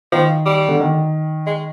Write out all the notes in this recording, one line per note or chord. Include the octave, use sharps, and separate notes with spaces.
D#3 F3
G3
D3
D#3
G#3